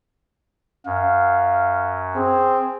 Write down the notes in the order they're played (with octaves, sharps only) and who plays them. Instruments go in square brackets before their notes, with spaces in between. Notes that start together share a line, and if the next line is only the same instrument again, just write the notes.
[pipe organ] F#2 [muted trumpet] F5
[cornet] C4 [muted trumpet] G#4